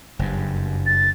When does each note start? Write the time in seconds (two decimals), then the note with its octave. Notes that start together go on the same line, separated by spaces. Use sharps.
0.19 F#1 G2
0.86 A6